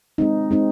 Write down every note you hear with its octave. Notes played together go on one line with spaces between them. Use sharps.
G#3 C4 D#4
G#3 C4 D#4